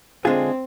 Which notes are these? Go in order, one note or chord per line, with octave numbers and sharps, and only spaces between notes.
D3 G#3 C4 D4 F4 G#4